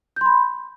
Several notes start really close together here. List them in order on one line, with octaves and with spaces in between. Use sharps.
G6 C6 B5